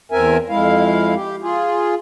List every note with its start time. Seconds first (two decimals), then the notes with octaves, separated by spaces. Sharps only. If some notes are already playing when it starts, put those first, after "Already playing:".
0.12 E2 C4 A#4 E5 G#5
0.49 F2 G#3 E4 F5
1.14 G4
1.42 F4 G#4